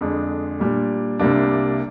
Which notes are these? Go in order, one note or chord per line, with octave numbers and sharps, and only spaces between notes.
F2 D3 G#3 D4
A#2 G3 D4
C2 C3 G3 A#3 D4